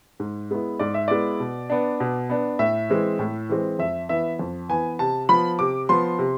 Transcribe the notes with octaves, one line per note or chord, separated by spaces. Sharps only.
G#2
G#3 B3 E4
G#2 D5
E5
G#3 B3 E4 D5
B2
B3 D4
B2
B3 D4
A2 E5
E3 G#3 C4
A2
E3 G#3 C4
F2 E5
E3 B3 E5
F2
E3 B3 G#5
C3 A5
F3 B3 B5
C3 D6
F3 B3 C6
C3